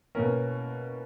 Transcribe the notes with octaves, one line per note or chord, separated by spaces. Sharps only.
B2 A#3 C#4 A#4